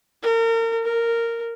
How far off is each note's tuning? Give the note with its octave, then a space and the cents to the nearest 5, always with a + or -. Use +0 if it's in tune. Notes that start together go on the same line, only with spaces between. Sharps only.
A#4 -35
A#4 -10